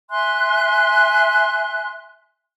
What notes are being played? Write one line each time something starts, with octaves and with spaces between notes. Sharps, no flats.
E5 G#5 C6 F#6